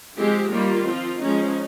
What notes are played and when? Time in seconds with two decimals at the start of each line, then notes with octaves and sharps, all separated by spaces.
0.16 F3 G#3 C4 G4
0.50 D#3 G3 A#3 F4
0.85 F3 C4
1.19 F3 G#3 C#4 D#4